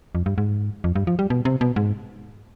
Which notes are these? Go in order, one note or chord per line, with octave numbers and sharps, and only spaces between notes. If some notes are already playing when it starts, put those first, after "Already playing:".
F2
G2
G#2
F2
G2
F3
G3
B2
C3
B2
G#2